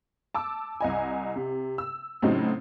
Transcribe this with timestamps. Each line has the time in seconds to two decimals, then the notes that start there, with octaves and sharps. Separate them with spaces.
0.34 A5 D6 E6
0.81 C2 D#5 G#5
1.36 C3
1.78 E6
2.22 A2 C#3 F#3 C4 D#4